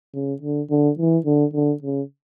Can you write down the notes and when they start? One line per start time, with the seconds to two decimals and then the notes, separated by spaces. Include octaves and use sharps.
0.14 C#3
0.42 D3
0.70 D3
0.99 E3
1.26 D3
1.54 D3
1.82 C#3